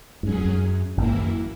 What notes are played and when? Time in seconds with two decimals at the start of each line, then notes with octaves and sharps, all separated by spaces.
0.23 G#2 F#3 C#4 G#4
0.31 F#2
0.38 E2
0.46 F#2
0.98 G#1 G#2 E3 A#3 E4
1.16 F#2